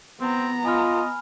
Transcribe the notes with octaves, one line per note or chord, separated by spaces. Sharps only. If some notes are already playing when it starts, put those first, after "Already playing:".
B3 C4 A#5
F4 D#5 G#5 B5 F6